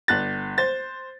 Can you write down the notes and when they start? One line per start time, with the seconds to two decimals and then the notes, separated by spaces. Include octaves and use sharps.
0.08 G1 F#6 A6
0.58 C5 A6